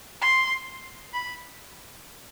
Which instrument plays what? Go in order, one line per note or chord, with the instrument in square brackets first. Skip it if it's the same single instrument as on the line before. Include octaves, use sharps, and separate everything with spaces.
[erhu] C6
B5